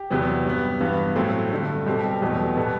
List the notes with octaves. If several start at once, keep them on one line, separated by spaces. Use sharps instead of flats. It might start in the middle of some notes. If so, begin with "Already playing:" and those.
Already playing: G4
E2 C3 F#3 B3
G2 F#3 B3
G2 E3 B3
A2 F#3 A3 C4
G2 D3 A3
B2 G3 C4 G4
A4
G4
E2 B2 F#3 A3
B2 G3 B3 A4